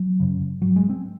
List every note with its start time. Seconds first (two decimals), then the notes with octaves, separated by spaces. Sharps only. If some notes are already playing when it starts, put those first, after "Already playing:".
Already playing: F#3
0.20 F#2 C#3
0.62 G#2 F#3
0.76 G#3
0.90 C4